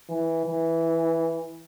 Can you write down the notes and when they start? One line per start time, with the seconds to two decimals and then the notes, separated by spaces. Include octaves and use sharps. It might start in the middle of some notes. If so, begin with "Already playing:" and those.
0.09 E3
0.46 E3